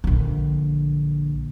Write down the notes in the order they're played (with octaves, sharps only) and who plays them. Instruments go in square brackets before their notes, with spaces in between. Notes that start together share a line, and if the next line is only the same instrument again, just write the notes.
[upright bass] A#1 D3